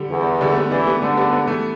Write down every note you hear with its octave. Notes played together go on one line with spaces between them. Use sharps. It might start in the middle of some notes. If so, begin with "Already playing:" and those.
Already playing: D3 G3
E2
D3 G3
A3
G3 B3
E3 A3 D4
G3 B3
D3 A3 D4
G3 B3
G3 B3
E3 A3